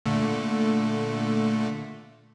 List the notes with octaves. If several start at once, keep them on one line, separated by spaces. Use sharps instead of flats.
A#2 D3 A3